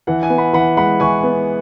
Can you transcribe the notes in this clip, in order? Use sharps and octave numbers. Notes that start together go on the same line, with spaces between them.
E3 F#5
E5 G#5
B3
F#5 B5
E3 F#5 B5
G#3 F#5 B5
E3 G#5 C#6
B3